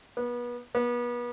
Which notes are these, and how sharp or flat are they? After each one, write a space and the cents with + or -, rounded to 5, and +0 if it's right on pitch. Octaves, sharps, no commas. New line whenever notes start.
B3 -30
B3 -35